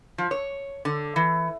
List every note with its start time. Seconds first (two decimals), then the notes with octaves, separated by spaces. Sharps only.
0.18 F3
0.31 C#5
0.85 D3
1.16 E3